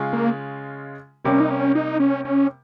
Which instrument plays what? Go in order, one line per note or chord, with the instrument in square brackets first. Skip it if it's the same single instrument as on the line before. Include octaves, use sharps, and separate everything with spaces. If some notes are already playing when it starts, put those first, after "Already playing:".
Already playing: [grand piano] C#3 G#3 C#4 F4
[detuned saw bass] A#3
[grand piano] C3 G3 A#3 [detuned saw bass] C#4
[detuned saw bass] D#4
C#4
D#4
C#4
C#4